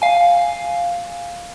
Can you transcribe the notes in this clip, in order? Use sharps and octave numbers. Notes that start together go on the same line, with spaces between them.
F5 G#5